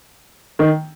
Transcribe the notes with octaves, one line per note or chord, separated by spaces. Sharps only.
D#3